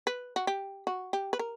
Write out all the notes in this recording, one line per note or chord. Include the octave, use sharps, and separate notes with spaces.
B4
F#4
G4
F#4
G4
B4
A#4